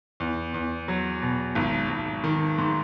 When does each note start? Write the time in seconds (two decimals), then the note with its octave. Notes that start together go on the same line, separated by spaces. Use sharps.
0.20 E2
0.54 E2
0.88 F#3
1.22 B2
1.55 G#1
1.89 G#1
2.24 D#3
2.58 G#2